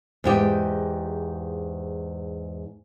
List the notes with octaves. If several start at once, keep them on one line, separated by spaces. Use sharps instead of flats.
E2 G#2 G4